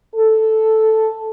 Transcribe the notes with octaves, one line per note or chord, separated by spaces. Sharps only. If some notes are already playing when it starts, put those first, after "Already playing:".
A4